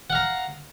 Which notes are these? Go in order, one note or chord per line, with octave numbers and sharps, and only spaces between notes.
F5 F#5 A#5